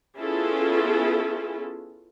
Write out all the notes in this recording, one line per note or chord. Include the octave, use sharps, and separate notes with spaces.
B3 C#4 E4 F4 G#4 A4